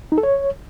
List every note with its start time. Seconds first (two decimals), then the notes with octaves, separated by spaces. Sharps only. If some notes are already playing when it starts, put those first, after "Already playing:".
0.12 D#4
0.18 A4
0.23 C#5